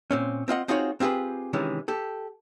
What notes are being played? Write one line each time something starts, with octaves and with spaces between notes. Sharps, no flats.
A#2 C4 C#4
C4 F4 D#5 F#5
C4 D#4 F4 F#4 G#4 C#5
C4 F4 G4 G#4 B4
C3 D#3 E3 G#3 C#4
G4 A4